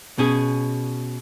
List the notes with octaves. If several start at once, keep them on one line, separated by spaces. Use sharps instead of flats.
B2 C#4 G#4